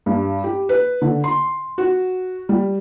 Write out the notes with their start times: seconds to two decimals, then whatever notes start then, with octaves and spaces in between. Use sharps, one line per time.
0.06 G2
0.44 G4
0.69 B4
1.02 D3
1.24 C6
1.78 F#4
2.49 G3